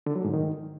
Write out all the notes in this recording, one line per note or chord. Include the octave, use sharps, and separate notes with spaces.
D3
F#3
G#2
D#3